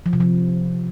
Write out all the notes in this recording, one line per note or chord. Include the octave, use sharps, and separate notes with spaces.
F3
C3
F3